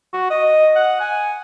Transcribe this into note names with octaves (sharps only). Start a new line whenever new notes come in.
F#4
D#5
F#5
G#5